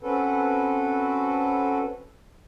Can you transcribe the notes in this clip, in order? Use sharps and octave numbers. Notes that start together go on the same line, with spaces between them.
C4 C#4 F#4 A4 B4